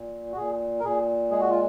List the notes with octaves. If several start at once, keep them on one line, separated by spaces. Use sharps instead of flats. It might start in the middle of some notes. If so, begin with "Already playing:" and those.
Already playing: A#2
F#4
A#2 G#4
A#4
A#2 G#4
G#3 G#4
F#4
F4